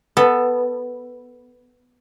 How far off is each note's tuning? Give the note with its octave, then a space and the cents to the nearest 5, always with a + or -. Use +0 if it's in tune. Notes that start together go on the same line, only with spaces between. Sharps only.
B3 +0 A4 +10